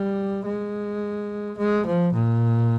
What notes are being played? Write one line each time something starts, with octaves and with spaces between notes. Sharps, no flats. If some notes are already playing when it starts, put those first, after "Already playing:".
Already playing: G3
G#3
G#3
F3
A#2